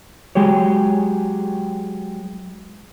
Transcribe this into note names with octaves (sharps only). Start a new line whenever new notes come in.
F#3 G#3 G4 G#4 C#5